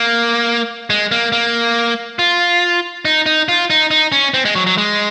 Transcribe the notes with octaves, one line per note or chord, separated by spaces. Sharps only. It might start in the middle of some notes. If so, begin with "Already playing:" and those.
Already playing: A#3
G#3
A#3
A#3
F4
D#4
D#4
F4
D#4
D#4
C#4
C4
G#3
F#3
F#3
G#3